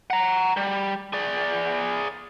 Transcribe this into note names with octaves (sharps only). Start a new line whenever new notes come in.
F#5 A#5
G3
G#4 D5